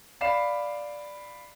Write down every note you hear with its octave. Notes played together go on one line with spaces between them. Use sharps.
D5 F5 B5 C7 E7